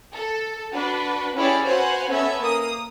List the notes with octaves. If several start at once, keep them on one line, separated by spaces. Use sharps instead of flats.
A4
D4 F#4 B4
C#4 E4 G4 G#4 C#5 D5
F#4 B4 C5 F5 F#5 G#5
B3 C#4 A4 B4 E5
A#3 D#6